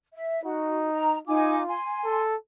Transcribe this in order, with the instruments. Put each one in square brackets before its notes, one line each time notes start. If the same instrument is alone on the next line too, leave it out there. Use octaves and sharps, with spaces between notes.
[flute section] E5
[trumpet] D#4 [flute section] F#4
[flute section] A#5
[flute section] D#4 G#5 D6 [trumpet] F4
[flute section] G#5 C6
[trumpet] A4